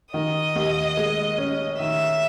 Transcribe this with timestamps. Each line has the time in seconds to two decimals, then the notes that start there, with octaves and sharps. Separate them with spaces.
0.14 D#3 D#5
0.56 D#2
0.97 G#3
1.38 C#4
1.80 D#3 E5